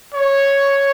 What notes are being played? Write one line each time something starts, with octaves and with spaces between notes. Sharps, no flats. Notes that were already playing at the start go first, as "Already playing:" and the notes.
C#5